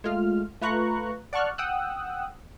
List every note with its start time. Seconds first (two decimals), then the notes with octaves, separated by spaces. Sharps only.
0.04 G#3 A3 F4 F6
0.61 A3 F4 B4 A#5 C#6 F#6
1.33 D5 F#5 A5 C#6 F6 F#6
1.58 F#5 G5 D#6 E6 F#6